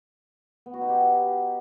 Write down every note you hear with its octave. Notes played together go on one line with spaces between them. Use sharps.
B3
F#4
D#4
G4